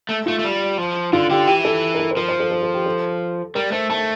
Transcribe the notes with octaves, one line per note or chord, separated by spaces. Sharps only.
A3
A3 F4
A3
G3
F3
D3 F4
D3 G4
E3 G4
A4
A#4
A4
C5
F3 A#4
C5
A4
A4
A4
G4
A4
G3 A#4
A3 C5
A3 A5